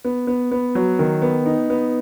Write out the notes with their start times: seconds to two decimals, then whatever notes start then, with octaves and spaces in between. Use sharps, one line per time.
0.05 B3
0.27 B3
0.51 B3
0.75 F#3
0.99 D#3
1.22 B3
1.46 D#4
1.70 B3